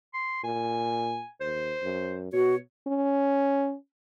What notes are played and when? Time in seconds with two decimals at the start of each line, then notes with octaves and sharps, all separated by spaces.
0.14 C6
0.44 A#2 G#5
1.41 D#2 C5
1.83 F#2
2.33 B2 F#4 C#5
2.87 C#4